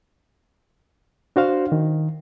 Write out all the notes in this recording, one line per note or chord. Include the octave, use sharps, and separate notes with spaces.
D4 F#4 C5 F5
D#3